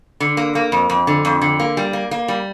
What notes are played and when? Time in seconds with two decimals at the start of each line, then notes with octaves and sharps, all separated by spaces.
0.20 D3
0.37 A#3
0.55 A#3
0.72 F2
0.90 F2
1.07 D3
1.25 F2
1.41 D3
1.60 A#3
1.77 G3
1.93 A#3
2.11 A#3
2.28 G3